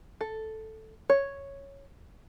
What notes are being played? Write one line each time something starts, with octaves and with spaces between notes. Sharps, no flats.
A4
C#5